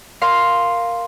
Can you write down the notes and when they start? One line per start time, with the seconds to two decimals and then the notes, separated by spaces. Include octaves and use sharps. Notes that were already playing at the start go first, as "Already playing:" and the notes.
0.22 A#4 F5 C6